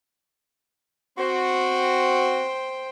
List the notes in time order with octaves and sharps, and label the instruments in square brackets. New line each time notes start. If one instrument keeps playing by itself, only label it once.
[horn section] C4 F#4 [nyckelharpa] C5 G5